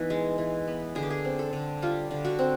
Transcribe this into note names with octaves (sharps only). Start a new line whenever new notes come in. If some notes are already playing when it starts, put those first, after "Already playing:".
Already playing: E3 B3 D#4
G#3
E3
B3
D3 G#4
G4
G#4
C4
A4
D3
G3 F4
D3
F#4
C4